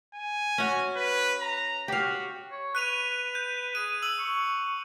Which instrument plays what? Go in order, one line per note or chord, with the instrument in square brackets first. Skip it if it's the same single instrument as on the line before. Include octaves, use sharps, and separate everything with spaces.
[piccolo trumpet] G#5
[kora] C#4 F#4
[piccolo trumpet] B4
A#5
[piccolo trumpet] F#4 [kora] G4 F5
[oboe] C#5
[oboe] B4 [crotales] F#6 D#7 F7
[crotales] G6
[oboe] G#4 [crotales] D#7
[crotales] E6 F#7
[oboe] C#6